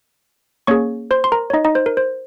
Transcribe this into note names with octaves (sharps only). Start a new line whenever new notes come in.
A#3 C#4 G#4 C#5 C#6
C5 C6
C6
A#4 A#5
C#5
D#4 D#5
D#4 D#5
C5
A#4
C5